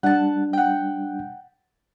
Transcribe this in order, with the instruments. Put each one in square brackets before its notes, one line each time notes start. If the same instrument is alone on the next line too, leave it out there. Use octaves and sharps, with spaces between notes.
[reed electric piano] G3 D4 [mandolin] F#5 A5
[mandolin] F#5 G5